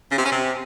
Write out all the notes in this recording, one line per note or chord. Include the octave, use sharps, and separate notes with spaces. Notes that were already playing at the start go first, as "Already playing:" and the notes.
C#3
C3
C#4
C3